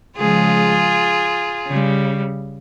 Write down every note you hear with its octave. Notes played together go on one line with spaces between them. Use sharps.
C#3 F3 G#3 F4 G#4
C#3 G3